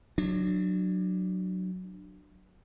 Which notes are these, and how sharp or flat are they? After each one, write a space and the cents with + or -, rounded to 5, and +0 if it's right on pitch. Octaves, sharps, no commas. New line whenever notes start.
F#3 +0 D4 +20